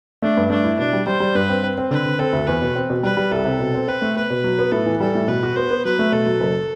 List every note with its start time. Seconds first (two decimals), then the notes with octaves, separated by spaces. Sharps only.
0.22 A3 D4
0.37 G2
0.50 A3 D4
0.64 E4
0.79 B2 D4
0.93 G3
1.07 G3 C5
1.20 G3
1.35 G2 B4
1.49 C4
1.63 C4
1.78 C4
1.91 D3 B4
2.06 D3
2.19 C4 A4
2.33 D2
2.47 E2 B4
2.62 B2
2.76 C4
2.90 B2
3.03 G3 B4
3.17 G3
3.31 C2 A4
3.45 C3
3.60 B2
3.74 C4
3.88 C4 B4
4.02 A3
4.16 B3 B4
4.30 B2
4.44 F#3
4.59 B3
4.72 A2 A4
4.86 E3
5.00 G3 A4
5.15 A2
5.28 B2 B4
5.43 F#4
5.56 B3 C5
5.71 B3
5.85 F#3 B4
5.99 A3
6.12 B2 A4
6.26 F#3
6.40 F#1